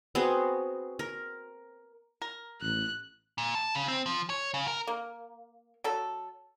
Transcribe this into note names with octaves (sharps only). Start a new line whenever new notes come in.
B3 C4 F#4 G#4
A#4
A#4
A1 F#6
A#2
A5
C#3
C4
F3
C#5
C#3
A#4
A#3
F#3 A4